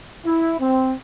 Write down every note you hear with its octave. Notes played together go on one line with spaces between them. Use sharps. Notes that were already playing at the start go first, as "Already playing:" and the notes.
E4
C4